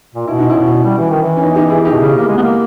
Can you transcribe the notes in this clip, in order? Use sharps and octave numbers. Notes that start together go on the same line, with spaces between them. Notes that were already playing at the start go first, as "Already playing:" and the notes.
A#2
B2 E4
D#4
A#2 C#4 E4
B2
G3
E3
D#3
E3
C#4
B3 D#4
D#4 G4
E4 G#4
D#4 G4
B2
C#3
A#3
G#3
B3
A#3